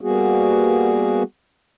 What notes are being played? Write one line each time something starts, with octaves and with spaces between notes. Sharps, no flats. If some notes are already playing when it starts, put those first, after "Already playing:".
G3 A#3 B3 F#4 G#4